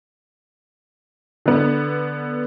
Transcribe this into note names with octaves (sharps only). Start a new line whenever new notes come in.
D3 B3